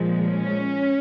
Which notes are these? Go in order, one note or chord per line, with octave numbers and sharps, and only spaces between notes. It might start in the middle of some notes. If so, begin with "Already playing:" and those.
Already playing: A#2 F3 G#3
C#4